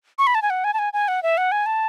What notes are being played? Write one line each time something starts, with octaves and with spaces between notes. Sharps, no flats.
C#6
B5
A5
G#5
F#5
G#5
A5
G#5
G#5
F#5
E5
F#5
G#5
A5